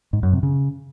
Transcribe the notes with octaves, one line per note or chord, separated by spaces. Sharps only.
G#2
F#2
C3
C#3